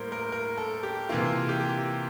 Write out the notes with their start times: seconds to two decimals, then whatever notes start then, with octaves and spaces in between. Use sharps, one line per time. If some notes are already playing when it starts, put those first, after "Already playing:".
Already playing: A2 G3 A#3 A#4 C5
0.12 A#4
0.32 A#4
0.58 A4
0.83 G4
1.09 C3 E3 A#3 F4
1.49 G4